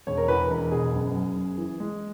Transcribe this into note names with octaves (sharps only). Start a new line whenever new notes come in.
E1 C#5
A#4
E2 B4
E1 A#4
B2 G#4
F#1
F#2
F#1
E3
G#3